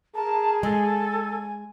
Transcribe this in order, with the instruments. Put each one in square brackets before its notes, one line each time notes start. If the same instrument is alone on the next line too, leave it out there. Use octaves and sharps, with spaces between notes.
[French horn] G#4 [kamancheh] A#4 [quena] A5
[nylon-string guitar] G#3 [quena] A4 [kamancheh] G#5